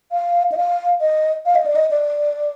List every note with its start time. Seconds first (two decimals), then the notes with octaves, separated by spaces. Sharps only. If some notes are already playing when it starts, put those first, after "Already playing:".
0.12 F5
0.52 D#5
0.57 F5
1.01 D#5
1.46 F5
1.55 D#5
1.66 D5
1.76 D#5
1.91 D5